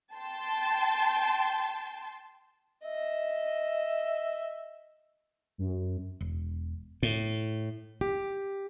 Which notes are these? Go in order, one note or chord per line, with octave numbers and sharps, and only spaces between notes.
G5 A5 C6
D#5 E5
F#2
E1
A2
G4